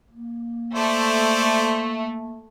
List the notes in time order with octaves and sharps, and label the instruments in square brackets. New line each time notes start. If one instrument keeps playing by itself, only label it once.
[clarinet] A#3
[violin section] A3 [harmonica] C5 D5